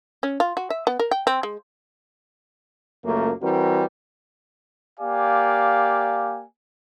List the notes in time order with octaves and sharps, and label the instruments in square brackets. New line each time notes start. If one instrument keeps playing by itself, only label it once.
[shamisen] C#4
F4
F#4
E5
B3
A#4
G5
C4
G#3
[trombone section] C#2 F#2 A3 A#3
E3 G3 C4 F#4 A#4
[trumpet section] A#3 G4 D5 F5 G#5